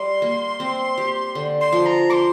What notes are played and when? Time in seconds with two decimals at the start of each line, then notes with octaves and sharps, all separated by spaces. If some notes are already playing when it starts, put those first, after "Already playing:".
Already playing: G3 C6
0.22 A#3
0.60 C4
0.98 G4
1.35 D3
1.61 C6
1.73 F3
1.86 A#5
2.10 C5 C6 D6